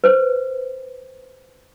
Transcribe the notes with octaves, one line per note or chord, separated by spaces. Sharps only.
B4 C5